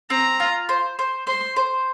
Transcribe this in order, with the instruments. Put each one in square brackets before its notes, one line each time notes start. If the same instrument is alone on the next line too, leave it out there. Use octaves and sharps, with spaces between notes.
[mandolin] C4 [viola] A#5
[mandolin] F4
C5
C5
[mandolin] C5 [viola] C6
[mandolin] C5